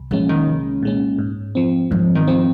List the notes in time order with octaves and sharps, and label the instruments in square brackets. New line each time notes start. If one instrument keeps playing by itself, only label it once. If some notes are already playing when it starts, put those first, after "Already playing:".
Already playing: [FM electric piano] C2
[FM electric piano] A#2 G#3 C#4 [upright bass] F3
[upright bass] D#3
[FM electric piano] C2
A#2 G#3 C#4
G#2
F3 C4
[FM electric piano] G#2 [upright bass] F3
[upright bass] D#3
[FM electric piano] F3 C4